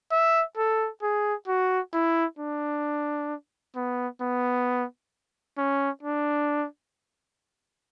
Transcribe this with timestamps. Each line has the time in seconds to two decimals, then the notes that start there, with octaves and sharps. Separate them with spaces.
0.12 E5
0.57 A4
1.02 G#4
1.48 F#4
1.94 E4
2.39 D4
3.76 B3
4.21 B3
5.58 C#4
6.03 D4